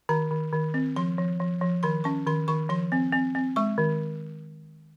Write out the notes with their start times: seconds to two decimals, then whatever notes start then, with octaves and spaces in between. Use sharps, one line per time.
0.09 D#3 A#5
0.31 D#3
0.53 D#3
0.74 C4
0.96 F3 C6
1.18 F3
1.40 F3
1.61 F3
1.83 D#3 C6
2.04 C#4 C#6
2.26 D#3 C6
2.48 D#3 C#6
2.69 F3 C6
2.92 C4
3.12 C4
3.35 C4
3.56 G#3 C#6
3.78 D#3